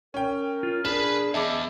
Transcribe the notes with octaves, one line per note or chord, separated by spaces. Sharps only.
C#4 A#4 G5
F4
D4 G#4 B4 B5 E7
E2 D#5 E5 A5 D6